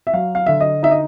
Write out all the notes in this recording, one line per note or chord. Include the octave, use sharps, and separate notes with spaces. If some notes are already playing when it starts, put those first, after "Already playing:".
E5
F#3 F5
F5
D3 E5
D#5
D#4 E5
D#5